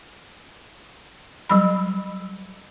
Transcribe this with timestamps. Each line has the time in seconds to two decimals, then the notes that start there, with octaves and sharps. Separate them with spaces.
1.49 F#3 G3 B5